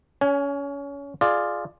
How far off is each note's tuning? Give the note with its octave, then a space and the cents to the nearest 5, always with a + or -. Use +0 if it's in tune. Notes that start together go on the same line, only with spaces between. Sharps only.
C#4 +25 G#5 +0
F4 +0 G#4 +15 D5 +15